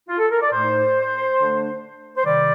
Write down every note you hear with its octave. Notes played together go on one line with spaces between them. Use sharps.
F4
A4
A#4
D5
A2 A3 D#4 C5
D3 A3 D4
C5
C3 D#3 G3 D5